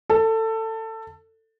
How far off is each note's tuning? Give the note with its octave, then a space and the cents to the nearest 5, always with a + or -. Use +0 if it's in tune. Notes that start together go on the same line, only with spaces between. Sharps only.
A4 +20